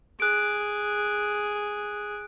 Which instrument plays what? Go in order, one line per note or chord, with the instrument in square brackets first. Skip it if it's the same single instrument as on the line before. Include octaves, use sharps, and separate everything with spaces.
[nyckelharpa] G#4 [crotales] F#6 D7